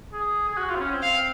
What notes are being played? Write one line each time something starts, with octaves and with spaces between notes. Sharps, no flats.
G#4
G#4
F#4
F4
C4
C#4
C4
F5